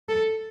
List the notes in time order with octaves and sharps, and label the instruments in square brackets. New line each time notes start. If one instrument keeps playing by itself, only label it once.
[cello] A4